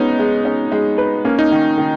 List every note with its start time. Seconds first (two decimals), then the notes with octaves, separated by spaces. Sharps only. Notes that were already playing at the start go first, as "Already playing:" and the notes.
Already playing: G#3 B3 C#4 D#4
0.19 G#3
0.45 C#4
0.72 G#3
0.98 B4
1.25 A#3 C#4
1.39 D#4
1.51 D#3 C#4
1.78 D#3